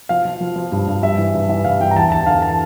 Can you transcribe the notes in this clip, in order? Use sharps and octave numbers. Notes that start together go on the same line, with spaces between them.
F3 F5
F3
F3
F3
G2
G2
G2 E5
E3
G2
E3 E5
G2 F5
E3 G5
A#5
E2 A5
E2 A5
D3 F5
A5